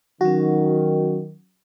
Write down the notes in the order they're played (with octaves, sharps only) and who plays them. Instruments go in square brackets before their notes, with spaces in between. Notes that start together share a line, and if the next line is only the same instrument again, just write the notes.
[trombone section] D#3 [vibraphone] F#3 C#4 [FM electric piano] F#4